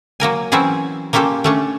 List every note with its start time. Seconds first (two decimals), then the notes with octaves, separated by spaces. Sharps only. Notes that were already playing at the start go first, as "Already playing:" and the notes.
0.20 F#3 A#3 A#4 G#5
0.52 E3 F#3 C4 C#4 E4 G#4
1.13 A#3 C#4 F4 G4 A4
1.44 A3 C#4 D4